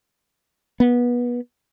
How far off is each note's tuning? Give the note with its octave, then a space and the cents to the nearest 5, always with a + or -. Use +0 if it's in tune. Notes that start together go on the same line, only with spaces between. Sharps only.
B3 -25